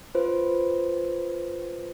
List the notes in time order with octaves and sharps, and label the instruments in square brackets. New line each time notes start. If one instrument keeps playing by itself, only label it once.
[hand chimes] F4 B4 C5